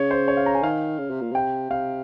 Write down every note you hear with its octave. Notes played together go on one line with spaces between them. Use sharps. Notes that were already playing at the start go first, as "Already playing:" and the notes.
Already playing: C#3 C#5
C5
C#5
F5
A#5
G#5
D#3 F5
C#3
C3
A#2
C3 G5
C3 F5